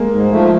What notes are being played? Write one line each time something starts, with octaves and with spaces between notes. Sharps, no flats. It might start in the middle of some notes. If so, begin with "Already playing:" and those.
Already playing: G#3 A#3
G#2
F3 A3